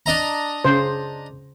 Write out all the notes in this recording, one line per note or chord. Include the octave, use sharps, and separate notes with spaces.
D4 D#5 A#5
C#3 C5